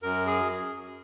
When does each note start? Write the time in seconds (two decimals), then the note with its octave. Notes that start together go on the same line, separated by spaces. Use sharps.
0.03 F#2 A#4
0.27 G#4